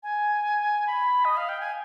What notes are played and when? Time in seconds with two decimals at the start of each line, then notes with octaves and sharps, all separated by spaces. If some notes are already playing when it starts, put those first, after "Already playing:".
0.03 G#5
0.87 B5
1.25 D#5
1.37 F5
1.49 G5
1.60 G#5